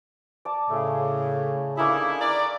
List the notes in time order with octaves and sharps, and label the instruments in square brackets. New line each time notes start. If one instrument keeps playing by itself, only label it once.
[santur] D5 A5
[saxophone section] A2 [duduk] C#3 [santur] A3 G#4
[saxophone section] D3 D#4 E4 [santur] A#3 C#4 G#4
[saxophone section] A#4 B4 D5